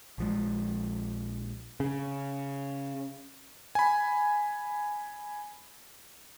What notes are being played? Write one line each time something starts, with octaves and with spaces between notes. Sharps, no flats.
A#1 F3 G#3
C#3
G#5 B5